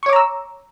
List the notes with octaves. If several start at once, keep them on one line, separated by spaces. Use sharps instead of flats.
C#5 A#5 C#6 D6 E6